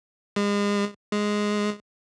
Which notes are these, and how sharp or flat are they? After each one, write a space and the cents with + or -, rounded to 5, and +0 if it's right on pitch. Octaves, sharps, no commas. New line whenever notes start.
G#3 -35
G#3 +0